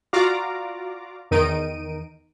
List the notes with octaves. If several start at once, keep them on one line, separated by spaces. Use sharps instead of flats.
F4 F#4 D5 F5 A#5 D6
E2 D#3 D#4 D7 D#7